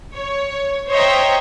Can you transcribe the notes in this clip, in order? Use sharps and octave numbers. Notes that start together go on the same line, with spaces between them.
C#5
C5 C#5 D#5 E5 G5 A#5